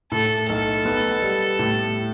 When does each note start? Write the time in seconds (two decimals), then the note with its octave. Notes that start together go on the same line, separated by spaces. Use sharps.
0.12 A2 A4
0.48 B1 A4
0.85 B3
1.22 G3
1.59 A2